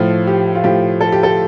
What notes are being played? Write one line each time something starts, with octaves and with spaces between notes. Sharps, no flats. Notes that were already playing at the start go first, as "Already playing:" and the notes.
Already playing: A2 F3
G4
F4
A2 F3 G4
A4
G4
A4